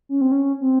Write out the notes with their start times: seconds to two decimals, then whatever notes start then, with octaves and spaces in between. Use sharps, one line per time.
0.09 C#4
0.21 C4
0.32 C#4
0.61 C4